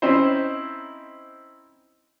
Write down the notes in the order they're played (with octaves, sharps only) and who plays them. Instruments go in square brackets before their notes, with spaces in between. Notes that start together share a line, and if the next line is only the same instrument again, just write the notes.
[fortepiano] C4 C#4 D#4 E4 C5